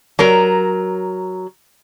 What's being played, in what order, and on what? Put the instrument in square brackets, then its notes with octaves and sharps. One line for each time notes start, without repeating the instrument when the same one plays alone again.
[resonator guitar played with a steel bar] F#3 A#4